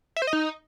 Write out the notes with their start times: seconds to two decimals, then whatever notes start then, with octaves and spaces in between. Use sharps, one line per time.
0.16 E5
0.22 C5
0.27 D#5
0.33 D#4